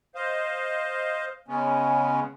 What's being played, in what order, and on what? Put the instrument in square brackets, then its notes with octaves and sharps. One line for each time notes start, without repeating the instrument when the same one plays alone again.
[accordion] C5 D#5 F5
C#3 G#3 B3 C#4